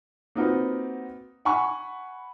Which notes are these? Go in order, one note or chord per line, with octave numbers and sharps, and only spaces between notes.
A#3 C4 D#4 F4 F#4 B4
F#5 G#5 B5 C#6